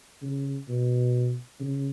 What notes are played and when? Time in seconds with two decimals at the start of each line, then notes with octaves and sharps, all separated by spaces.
0.22 C#3
0.68 B2
1.60 C#3